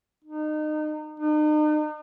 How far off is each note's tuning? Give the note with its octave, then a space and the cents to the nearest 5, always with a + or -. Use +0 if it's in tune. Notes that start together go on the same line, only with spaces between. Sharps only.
D#4 -30
D#4 -40